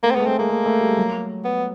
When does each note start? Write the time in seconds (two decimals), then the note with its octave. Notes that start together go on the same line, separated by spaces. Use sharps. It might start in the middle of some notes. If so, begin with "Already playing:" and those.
0.03 A3 A#3
0.11 C4
0.15 G#3 B3
0.21 A3
0.26 G#3 C4
0.39 G#3 A#3
0.50 A3
0.66 A3
0.81 G3
0.97 F#3
1.44 B3